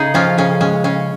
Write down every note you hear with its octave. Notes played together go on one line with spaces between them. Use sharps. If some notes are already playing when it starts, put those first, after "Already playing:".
Already playing: C#3 D#4 G#4
F3 C#4 F4
C#3 C#4
G#3 C#4
C#3 C#4